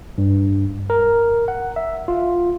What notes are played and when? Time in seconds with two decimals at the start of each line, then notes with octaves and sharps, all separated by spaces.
0.18 G2
0.90 A#4
1.48 F#5
1.76 E5
2.08 F4